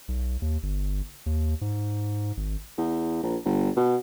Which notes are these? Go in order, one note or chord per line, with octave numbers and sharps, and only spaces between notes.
B1
D#2
G1
D#2
G#2
G#1
E2
A#1
G1
B2